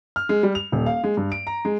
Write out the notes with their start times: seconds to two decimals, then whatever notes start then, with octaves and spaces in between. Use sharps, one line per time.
0.16 F6
0.29 G#3
0.43 G3
0.55 F7
0.72 D#1
0.86 F5
1.04 G#3
1.17 G2
1.32 D7
1.47 A#5
1.65 G#3